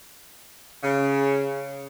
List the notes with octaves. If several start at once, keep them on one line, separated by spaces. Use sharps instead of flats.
C#3